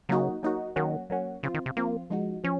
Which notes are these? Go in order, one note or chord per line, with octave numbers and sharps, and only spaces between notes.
C#3 F#3 A#3 D#4 F#4
F#3 A#3 D#4 F#4
D#3 F#3 A#3 C#4 F#4
F#3 A#3 C#4 F#4
C#3 F3 C4 F4
D#3
C3
F3 A#3 C4 F4
F3 G#3 D#4 F#4
F3 C#4